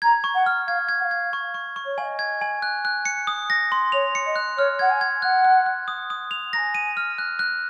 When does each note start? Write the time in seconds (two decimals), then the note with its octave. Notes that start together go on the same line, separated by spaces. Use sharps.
0.02 A#5 G#6
0.24 C#6
0.35 F#5
0.46 F6
0.67 F5 G#6
0.89 G#6
1.00 F#5
1.04 F5
1.11 G#6
1.33 C#6
1.54 C#6
1.76 C#6
1.85 C#5
1.98 F5 G#5
2.03 D#5
2.19 G#6
2.41 G#5
2.62 F#6
2.85 F#6
3.05 C#7
3.27 D#6
3.50 A#6
3.72 C6
3.92 C#5 F7
4.15 C#7
4.26 D#5
4.36 F#6
4.57 C#5 F6
4.79 F#5 G#6
4.90 G#5
5.01 G#6
5.22 F#5 F#6
5.45 F#6
5.66 F#6
5.88 D#6
6.10 D#6
6.31 F7
6.53 A#5 A#6
6.57 G#5
6.75 D#7
6.97 F6
7.18 F#6
7.39 F#6